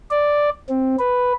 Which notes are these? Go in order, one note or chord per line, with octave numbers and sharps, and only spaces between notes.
D5
C4
B4